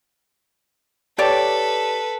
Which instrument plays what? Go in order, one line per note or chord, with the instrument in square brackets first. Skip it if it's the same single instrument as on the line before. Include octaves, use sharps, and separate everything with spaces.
[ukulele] G4 C#5 D5 [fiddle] A4 B4